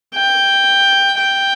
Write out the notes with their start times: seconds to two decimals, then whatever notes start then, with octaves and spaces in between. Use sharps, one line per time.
0.15 G5
1.18 G5